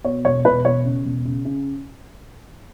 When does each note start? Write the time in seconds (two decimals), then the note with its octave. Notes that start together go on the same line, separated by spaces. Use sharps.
0.04 B2 C#5
0.25 E1 C#5
0.44 E1 B4
0.65 E1 C#5
0.85 C#3
1.04 E1
1.25 C#3
1.45 C#3